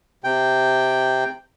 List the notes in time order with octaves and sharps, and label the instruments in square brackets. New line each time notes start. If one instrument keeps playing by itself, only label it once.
[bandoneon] C3 G5